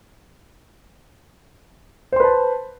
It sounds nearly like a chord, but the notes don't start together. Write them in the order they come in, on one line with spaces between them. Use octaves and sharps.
C5 C6 B4 A5